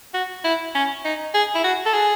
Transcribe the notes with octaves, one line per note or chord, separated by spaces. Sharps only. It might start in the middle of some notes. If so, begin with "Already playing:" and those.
F#4
E4
C#4
D#4
G#4
E4
F#4
A4
G#4